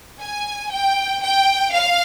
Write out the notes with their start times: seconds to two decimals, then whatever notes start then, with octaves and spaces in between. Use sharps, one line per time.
0.20 G#5
0.71 G5
1.22 G5
1.72 F5